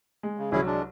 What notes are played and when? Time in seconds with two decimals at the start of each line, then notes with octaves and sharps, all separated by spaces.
0.23 G#3
0.38 C#3
0.52 C2 F#3 C#4 E4 G#4
0.66 G#3 D4